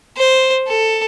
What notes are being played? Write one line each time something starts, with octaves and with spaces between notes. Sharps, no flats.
C5
A4